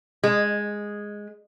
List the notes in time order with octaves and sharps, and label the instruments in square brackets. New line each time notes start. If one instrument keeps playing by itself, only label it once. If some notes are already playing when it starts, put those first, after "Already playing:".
[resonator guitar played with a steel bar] G#3